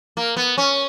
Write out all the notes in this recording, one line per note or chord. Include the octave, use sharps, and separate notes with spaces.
A#3
B3
C#4